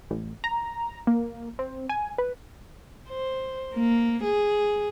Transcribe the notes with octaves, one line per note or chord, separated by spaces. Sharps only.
A1
A#5
A#3
C4
G#5
B4
C5
A#3
G#4